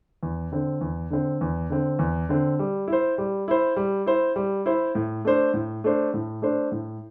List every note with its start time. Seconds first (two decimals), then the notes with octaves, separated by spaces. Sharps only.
0.23 E2
0.52 D3 C4
0.81 E2
1.10 D3 C4
1.41 E2
1.70 D3 C4
1.99 E2
2.29 D3 C4
2.59 G3
2.88 E4 C5
3.18 G3
3.48 E4 C5
3.76 G3
4.06 E4 C5
4.36 G3
4.66 E4 C5
4.95 A2
5.25 A3 D4 C5
5.54 A2
5.84 A3 D4 C5
6.14 A2
6.42 A3 D4 C5
6.72 A2